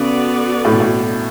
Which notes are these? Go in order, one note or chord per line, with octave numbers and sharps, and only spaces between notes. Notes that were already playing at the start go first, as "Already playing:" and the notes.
Already playing: C#3 B3 F#4 A4 D5
A2
B2
A2